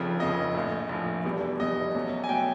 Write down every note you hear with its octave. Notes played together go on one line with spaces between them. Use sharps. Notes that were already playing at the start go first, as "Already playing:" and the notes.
Already playing: F1 F2 C#3 F3
F1 F2 C#3 F3 D#5
A#1 A2 F3
A#1 A2 F3
F1 E2 B2 G3
F1 E2 B2 G3 D#5
E2 B2 F#3 A3 C#4
G#5
B2 F#3 A3 C#4 G5